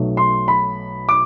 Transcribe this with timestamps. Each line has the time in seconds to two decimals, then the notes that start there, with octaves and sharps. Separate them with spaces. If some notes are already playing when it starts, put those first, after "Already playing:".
Already playing: B1 B2 F#3 A3
0.17 C6
0.48 B5
1.09 D6